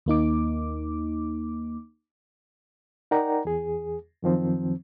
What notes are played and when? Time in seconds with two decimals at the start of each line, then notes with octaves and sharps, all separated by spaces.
0.06 D#2 A#3 D#4 D6
3.11 D#4 A#4 D5 F#5 G5 A#5
3.45 E2 G#4
4.23 F#2 D#3 F3 C4